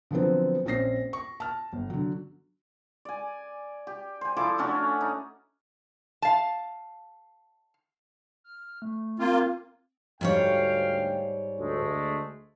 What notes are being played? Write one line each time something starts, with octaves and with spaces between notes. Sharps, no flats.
D3 F3 F#3 B3 C4
A#1 C4 C#4 A#6 C7
C#6
A5 F6
G1
D3 F#3
D5 G#5
G4
C5 G#5
F3 E4 A4 D6
A3 C#4 D4 F#4
D#4
F5 A5
F6
A3
A#3 C4 F4
D2 G#2 G3 C#5 F5 G5
D2 G#3 A3